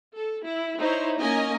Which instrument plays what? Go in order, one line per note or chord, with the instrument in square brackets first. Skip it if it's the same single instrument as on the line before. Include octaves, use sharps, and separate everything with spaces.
[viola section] A4
E4
D#4 E4 C5 C#5
A#3 C#4 D#5 G#5